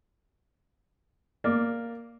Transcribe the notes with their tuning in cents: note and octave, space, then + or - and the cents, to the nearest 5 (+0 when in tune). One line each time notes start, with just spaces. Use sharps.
A#3 +0 D5 +0